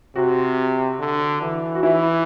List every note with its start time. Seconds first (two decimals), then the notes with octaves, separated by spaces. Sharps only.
0.16 C3 F#4
1.00 D3
1.41 E3
1.75 F#4
1.83 E3 E4